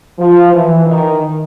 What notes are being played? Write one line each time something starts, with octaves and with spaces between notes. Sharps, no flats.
F3
E3
D#3